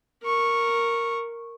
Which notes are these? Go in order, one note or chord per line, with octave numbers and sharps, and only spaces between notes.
A#4 C#6